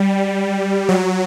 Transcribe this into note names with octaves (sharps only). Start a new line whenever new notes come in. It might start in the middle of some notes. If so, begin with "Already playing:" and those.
Already playing: G3
F#3